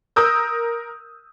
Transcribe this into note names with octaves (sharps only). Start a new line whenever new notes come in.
A#4 D#6 E6 G6